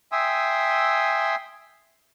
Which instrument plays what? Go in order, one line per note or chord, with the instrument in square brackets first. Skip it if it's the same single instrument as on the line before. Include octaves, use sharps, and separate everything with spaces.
[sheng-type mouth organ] E5 G5 G#5 C6 D#6 E6